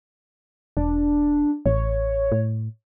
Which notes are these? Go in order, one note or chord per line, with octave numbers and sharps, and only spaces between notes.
E1 D4
A1 C#5
A2